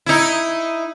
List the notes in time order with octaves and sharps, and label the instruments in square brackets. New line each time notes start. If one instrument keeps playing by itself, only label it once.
[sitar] D#4 E4